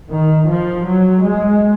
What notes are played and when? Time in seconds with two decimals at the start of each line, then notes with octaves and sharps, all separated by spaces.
0.09 D#3
0.48 F3
0.86 F#3
1.24 G#3